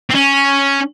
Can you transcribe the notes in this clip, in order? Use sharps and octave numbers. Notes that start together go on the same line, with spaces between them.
C4
C#4